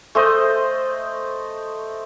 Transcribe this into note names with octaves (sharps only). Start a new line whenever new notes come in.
A3 C5 D#5